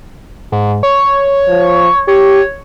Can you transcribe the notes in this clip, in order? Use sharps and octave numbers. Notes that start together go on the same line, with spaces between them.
G#2
C#5
F3
G4 C#5